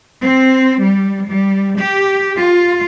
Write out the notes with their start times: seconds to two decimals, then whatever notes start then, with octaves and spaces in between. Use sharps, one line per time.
0.22 C4
0.82 G3
1.29 G3
1.79 G4
2.37 F4